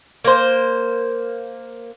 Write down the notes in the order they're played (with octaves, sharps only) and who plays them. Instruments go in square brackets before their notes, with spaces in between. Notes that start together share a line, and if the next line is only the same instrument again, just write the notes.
[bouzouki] A#3 C5